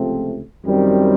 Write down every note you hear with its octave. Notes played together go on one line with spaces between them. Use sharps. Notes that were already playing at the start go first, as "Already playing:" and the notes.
Already playing: C#2 C3 F3 A3 C4
F#2 D#3 G3 C4